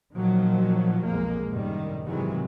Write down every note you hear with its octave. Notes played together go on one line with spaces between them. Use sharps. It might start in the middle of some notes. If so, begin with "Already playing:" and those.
A#2 D#3 F3 F#3
B1 F2 G#3 A#3
F#2 A2 C3 D#3 G3
G#2 C3 D#3 E3 F#3 G#3